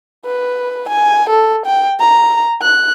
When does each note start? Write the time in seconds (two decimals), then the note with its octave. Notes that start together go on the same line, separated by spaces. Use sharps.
0.25 B4
0.89 G#5
1.29 A4
1.66 G5
2.00 A#5
2.62 F#6